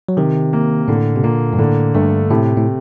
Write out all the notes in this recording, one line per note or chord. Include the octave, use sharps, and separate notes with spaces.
F#3
C3 D#3
A#3
A2 D3
C3
A#2 A#3
G2
A2 D3
G2 A3
A2 C3
A2